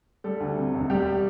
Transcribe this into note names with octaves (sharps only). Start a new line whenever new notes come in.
G3 A4
D2
C3
E1
G3 G4